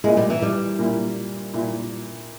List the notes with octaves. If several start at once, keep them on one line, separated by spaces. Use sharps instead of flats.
A#2 G#3 A#3 E4
G3
E3
G3
A#2 A#3 E4
A#2 A#3 E4